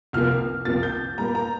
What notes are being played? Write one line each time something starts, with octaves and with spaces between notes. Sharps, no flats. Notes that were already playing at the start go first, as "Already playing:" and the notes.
C2 C3 F3 A#3 F6
C2 C3 F3 A#3 A6
G6
A#2 G3 A#3 A#5
A#5